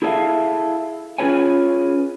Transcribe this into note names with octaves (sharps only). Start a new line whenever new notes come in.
E4 G#4 A4 C5 E5 F5
C#4 F4 G#4 B4 C#5 G#5